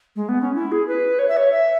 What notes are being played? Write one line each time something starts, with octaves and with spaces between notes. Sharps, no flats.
G#3
B3
C#4
E4
G#4
B4
C#5
E5
C#5
E5